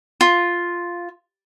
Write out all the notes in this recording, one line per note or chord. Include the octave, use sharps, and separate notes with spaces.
F4